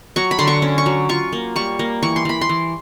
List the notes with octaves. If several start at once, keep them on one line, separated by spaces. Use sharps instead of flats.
F#3 C#6
B5
D3 C6
C#6
C#4
C#6
F#3
F4 C#6
A#3
G3 C#6
A#3
E3 C#6
C6
E3 B5
C6
E3